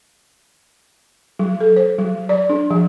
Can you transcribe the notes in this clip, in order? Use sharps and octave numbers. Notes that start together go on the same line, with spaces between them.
F#3
A4
C5
F#3
D5
D4
F3